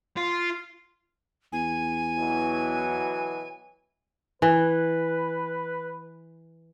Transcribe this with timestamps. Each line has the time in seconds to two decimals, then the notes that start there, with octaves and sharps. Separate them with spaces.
0.17 F4
1.52 E2 G#5
2.18 B2 E3 F#3
4.42 E3 B4